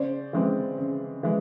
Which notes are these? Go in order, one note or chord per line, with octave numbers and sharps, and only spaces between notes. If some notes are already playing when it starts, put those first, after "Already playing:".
Already playing: C#3 C5 D5
E3 G#3 C4
C#3
E3 G#3